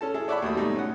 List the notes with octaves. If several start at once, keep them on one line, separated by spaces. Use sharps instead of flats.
C#4 A4 A5
E4 G#4 A4
C#5 D5 E5 F#5 A5 B5
D#2 A3 F#4 D#6
G#2 B2 G3 A3 D#4
C#4 F#5